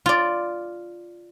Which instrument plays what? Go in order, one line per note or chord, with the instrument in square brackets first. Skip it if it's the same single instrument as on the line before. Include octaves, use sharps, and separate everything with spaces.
[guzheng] F4 D5